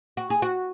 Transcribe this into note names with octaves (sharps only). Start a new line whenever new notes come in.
F#4
G#4
F#4